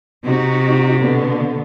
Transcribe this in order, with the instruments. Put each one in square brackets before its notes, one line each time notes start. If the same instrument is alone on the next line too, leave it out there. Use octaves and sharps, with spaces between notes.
[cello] C3 [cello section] D#4 F#4
[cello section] B2 D3 B3